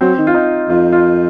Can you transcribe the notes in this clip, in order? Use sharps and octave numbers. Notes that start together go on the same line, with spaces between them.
F#3 C4
D#3
F4
D#4
F2 F4
F4